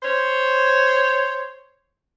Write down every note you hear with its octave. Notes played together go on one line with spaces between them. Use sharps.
C5 C#5